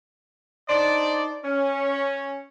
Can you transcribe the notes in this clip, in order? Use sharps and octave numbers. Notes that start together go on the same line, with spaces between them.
D4 D#4 C5 D5
C#4